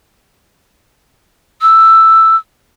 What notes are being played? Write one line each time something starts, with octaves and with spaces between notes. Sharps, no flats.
E6